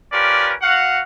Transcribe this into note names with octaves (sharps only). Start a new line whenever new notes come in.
C#4 F4 G4 A#4 B4 D5
F#4 F5 F#5